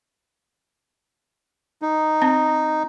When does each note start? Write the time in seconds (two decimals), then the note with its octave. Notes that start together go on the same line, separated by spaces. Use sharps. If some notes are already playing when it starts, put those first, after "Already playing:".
1.82 D#4
2.22 C4